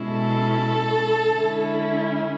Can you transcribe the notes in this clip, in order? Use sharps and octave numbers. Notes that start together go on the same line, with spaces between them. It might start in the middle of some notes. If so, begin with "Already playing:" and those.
Already playing: B2 G#3 C#4 E4
A4
D3 G#3 C#4 E4